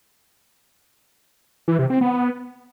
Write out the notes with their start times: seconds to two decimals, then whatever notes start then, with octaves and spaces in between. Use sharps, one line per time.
1.68 E3
1.79 C3
1.90 C4
2.01 B3